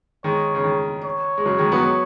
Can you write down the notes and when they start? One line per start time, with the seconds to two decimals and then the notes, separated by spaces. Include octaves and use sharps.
0.24 D#3 G#3 C#5
0.55 C#3
0.64 D#3
1.04 C#5
1.38 G#3
1.46 C#3 F#3
1.58 D#3 G#3
1.72 F#3 B3